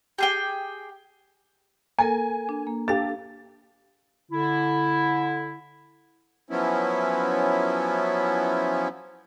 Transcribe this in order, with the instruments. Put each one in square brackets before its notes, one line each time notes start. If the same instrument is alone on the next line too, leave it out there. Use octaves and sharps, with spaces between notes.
[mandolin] G4 G#4 G5
[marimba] A#3 A4 A#4 [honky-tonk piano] G#5
[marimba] D4
A#3
[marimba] D4 F5 [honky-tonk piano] G4 A4 A6
[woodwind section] D3 E4
[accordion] F3 F#3 B3 C#4 E4